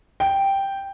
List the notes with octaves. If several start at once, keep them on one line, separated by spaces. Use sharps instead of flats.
G5